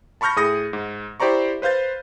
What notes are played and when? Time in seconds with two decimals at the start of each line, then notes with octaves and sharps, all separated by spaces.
0.21 A5 B5 C#6 F6 G6 A#6
0.36 A2 G#4 D#6 A#6 C#7
0.73 G#2
1.20 E4 G4 C5 D5 A#5 C#6
1.62 B4 C5 F5 G6 A6